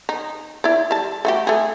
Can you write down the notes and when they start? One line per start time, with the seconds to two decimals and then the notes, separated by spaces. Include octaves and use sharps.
0.09 D#4
0.64 E4 D5
0.91 G3 A5
1.25 A3 F#4 G4
1.47 A3 G#4